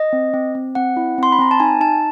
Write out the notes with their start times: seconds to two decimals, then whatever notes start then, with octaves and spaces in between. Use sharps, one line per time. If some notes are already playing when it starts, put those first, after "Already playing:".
Already playing: D#5
0.13 C4
0.34 C4
0.55 C4
0.75 C4 F#5
0.97 E4
1.18 C4 C6
1.32 B5
1.39 C4 A#5
1.51 A5
1.60 D#4 G#5
1.80 D#4 A5